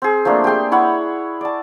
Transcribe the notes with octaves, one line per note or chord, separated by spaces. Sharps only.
C4 G#4
F3 A3 A#3 D4
G4 G#4 G5 C6
E4 C#5 F#5 B5
D5 A5